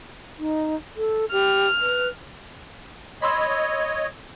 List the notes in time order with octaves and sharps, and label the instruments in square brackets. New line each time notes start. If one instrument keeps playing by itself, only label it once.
[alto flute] D#4
A4
[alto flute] G4 [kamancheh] F6
[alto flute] B4
[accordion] C#5 D#5 [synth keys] B5 C6 E6